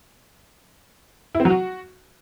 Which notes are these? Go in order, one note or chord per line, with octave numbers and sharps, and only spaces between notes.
E4
C4
F#3
F#4